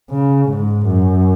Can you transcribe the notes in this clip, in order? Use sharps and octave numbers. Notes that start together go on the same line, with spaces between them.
C#3
G#2
F#2